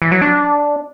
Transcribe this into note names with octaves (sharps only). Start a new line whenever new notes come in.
E3
F#3
D4